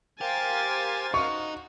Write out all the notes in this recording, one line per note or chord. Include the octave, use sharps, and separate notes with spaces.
G4 A#4 C5 F5 G#5 A6
D#4 F#4 C#6